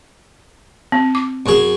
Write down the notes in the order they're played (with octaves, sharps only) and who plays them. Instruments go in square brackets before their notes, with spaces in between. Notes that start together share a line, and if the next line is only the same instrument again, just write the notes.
[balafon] C4
D6
[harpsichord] F#2 G#4